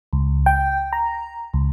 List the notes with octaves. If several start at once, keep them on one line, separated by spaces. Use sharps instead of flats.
C#2
G5
A#5
C#2